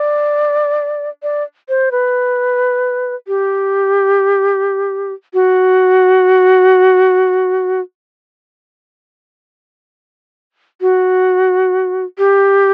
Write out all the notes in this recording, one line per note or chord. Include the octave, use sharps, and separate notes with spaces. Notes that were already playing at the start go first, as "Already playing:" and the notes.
Already playing: D5
D5
C5
B4
G4
F#4
F#4
G4